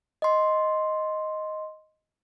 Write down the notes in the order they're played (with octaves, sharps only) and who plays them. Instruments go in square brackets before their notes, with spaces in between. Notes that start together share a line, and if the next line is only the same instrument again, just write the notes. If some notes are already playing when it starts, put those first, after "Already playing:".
[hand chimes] D#5 C6